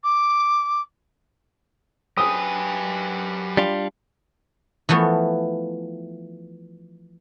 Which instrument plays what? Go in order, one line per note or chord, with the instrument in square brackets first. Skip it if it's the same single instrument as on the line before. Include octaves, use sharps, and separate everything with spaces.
[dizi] D6
[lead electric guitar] F#3 G#5 [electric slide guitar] G4 B4 [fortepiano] D#6
[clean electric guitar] G3 D4 F4
[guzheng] E3 F3 A3 B3